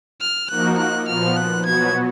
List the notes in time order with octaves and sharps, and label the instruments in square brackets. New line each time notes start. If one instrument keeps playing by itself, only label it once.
[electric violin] F6
[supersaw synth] F3 A#3 D#4 F#4 A#4 [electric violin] F#6
[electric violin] F#6
[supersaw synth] A#2 F3 B3 [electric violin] F6
[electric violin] F#6
[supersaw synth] B2 F#3 B3 F#4 [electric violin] G#6